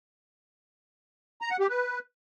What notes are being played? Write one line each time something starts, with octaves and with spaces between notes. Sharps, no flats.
A#5
F#5
G4
B4